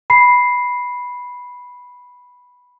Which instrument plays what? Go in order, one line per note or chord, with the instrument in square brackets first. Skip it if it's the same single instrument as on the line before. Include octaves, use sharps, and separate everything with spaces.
[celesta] B5 C7